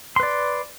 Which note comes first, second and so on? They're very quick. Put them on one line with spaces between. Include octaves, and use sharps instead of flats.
C6 B4 D5